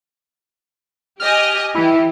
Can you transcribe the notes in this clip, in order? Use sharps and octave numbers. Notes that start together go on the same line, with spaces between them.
G4 D#5 G#5 F6
E3 E4 G4